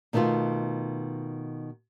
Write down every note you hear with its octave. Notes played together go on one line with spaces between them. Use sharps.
B2 D#3 A3 B3 F4